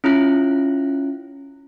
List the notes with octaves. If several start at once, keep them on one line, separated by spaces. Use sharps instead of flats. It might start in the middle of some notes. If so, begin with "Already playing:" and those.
C#4 E4 F4 F#6